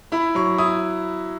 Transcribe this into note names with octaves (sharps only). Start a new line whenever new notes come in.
E4 B5
F#3 C#6
E4 D#6